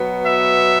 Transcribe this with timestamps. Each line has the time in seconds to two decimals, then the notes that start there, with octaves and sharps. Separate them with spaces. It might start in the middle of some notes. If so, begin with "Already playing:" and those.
Already playing: B2 F#3 B3
0.26 E5